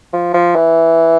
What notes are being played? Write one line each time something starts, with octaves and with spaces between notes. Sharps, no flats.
F3
F3
E3